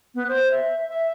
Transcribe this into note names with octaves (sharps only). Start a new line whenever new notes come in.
B3
C5
E5
E5